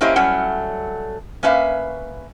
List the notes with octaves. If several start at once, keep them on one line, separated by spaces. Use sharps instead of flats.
A#3 C#4 E4 G4 C5 D#5
F#3 G3 A3 C#4 F#5
A#3 C#4 B4 E5 F5